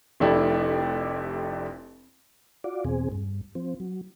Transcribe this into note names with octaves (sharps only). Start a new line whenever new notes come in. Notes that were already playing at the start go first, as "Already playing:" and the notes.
F1 F2 A3 D4 E4 G4
F4 F#4 D5
E2 B2 C4 G#4
G2
F3 C4
F#3